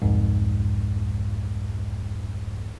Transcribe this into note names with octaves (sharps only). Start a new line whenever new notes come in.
C2 F2 G#2